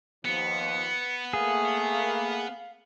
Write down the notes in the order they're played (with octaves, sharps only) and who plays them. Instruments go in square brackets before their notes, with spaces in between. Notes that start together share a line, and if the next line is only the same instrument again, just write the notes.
[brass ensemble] D#2 F3 [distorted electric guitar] B3 [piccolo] C#7
[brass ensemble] A3 A#3 [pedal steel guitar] G#4 [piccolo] F5